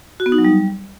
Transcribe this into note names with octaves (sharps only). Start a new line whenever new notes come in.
F#4
B3
D#4
F#3
G3